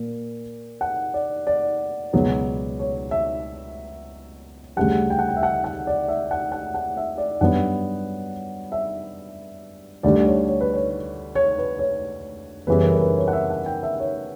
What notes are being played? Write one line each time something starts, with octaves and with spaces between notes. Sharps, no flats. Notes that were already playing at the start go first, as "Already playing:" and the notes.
Already playing: A#2 A#3
F#5
D5
D5
C#2 B2 F#3 B3
C#5
E5
D2 C#3 G3 F#5
G5
F#5
G5
E5
F#5
F#5
D5
E5
F#5
F#5
F#5
E5
D5
G2 F#3 B3 F#5
E5
D2 D3 G3 D5
C#5
C#5
B4
C#5
C#5
B4
C#5
F#2 C#3 E3 G3 B3 B4
A#4
A#4
B4
C#5
F#5
E5
F#5
G5
E5
C#5